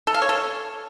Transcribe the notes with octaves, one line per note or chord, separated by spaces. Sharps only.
A4
F5
C#5
A4